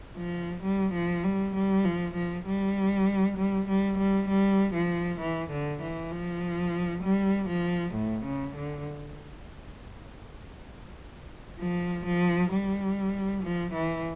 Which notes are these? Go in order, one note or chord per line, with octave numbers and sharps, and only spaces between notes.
F3
G3
F3
G3
G3
F3
F3
G3
G3
G3
G3
G3
F3
E3
D3
E3
F3
G3
F3
A2
C#3
D3
F3
F3
G3
F3
E3